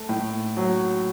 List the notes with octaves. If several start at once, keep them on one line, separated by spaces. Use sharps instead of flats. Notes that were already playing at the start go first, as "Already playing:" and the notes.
Already playing: A3
A2
F#3